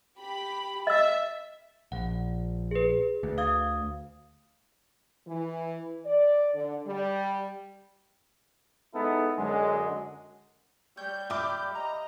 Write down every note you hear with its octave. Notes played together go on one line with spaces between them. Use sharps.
G4 B5
D#5 E5 E6
A#1 F#5
G#4 B4
D2
F5 D#6 G#6
E3
D5
D3
G3
G#3 B3 D#4 E4 A4
F#2 D3 F#3 G#3
G3 C#5 G6
E5 F5 G5 B5 D6
D#5 A#5